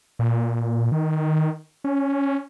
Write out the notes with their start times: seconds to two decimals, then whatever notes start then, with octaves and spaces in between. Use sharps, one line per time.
0.19 A#2
0.92 D#3
1.84 C#4